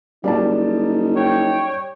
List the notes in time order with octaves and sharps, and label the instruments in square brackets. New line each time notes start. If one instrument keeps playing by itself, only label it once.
[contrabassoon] F#1 [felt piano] G3 D5 A5 [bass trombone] D#4
[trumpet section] C#5 G5